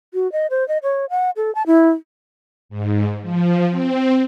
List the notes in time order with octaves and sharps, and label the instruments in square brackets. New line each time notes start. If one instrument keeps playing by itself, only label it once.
[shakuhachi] F#4
D#5
C5
D#5
C#5
F#5
A4
A5
E4
[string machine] G#2
F3
C4